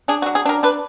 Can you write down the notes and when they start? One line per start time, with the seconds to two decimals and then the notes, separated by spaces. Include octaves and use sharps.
0.08 D4 G#4
0.22 F#4
0.26 F#3
0.35 G#4
0.45 D4 A#4
0.63 D4 B4